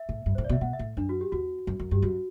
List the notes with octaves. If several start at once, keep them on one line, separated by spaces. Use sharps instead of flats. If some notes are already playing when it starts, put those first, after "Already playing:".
Already playing: E5
A2
G2
A2 C5
D5
B2
E5
B2 F#5
E5
A2
F#2 D4
F#4
G4
E2 F#4
F#2
F#2
G2 G4
F#2 F#4